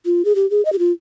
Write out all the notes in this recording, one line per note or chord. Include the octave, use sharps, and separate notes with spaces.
F4
G#4
G4
G#4
D#5
G4
F4